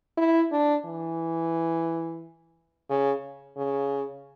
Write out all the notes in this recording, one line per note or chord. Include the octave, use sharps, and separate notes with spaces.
E4
D4
E3
C#3
C#3